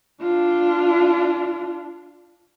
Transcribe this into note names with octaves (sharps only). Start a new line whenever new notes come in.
D4 F4